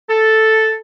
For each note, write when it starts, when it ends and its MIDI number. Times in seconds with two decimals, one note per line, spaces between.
0.10 0.76 69